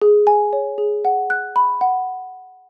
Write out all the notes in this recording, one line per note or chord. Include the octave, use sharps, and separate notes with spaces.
G#4
G#5
C#5
G#4
F#5
F#6
B5
F#5